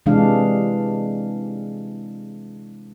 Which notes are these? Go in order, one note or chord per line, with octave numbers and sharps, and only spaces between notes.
C3 E3 G#3 D4 F5